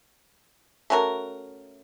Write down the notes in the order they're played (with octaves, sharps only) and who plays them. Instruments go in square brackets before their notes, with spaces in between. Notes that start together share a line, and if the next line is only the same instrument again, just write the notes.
[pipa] A3 C#4 F#4 A#4